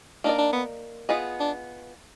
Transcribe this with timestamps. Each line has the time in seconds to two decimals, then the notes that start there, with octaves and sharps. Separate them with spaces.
0.24 A#3 D4 D#4 A#4 D5
0.38 D4
0.53 B3
1.09 B3 F4 G#4 D#5
1.40 D4